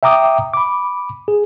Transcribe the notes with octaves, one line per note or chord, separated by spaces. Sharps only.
E5 G5 A#5 D6 D#6
B5 D6
G#4